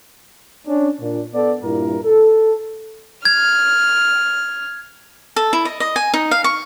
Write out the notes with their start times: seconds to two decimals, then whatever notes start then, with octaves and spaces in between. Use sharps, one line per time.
0.66 C#4 D4
1.01 A#2 D4
1.34 B3 A4 D5
1.63 G2 A#2 E4 A#4
2.04 A4
3.25 F6 G#6
5.36 A4
5.53 E4
5.65 D#5
5.80 D#5
5.96 G#5
6.14 D#4
6.31 F5
6.44 C#6